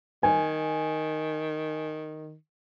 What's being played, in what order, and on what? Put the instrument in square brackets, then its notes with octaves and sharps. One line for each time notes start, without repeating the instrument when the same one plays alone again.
[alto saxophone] D#3 [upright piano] G#5